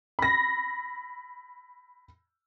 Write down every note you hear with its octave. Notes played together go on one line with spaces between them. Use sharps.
B5 A#6